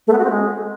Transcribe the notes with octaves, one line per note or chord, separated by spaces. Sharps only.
A3
B3
F#4
C4
G#3